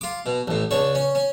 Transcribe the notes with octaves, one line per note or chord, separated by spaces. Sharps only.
F4 D6
B2
A1 A2
C#2 D4 C#5
C#4
C#4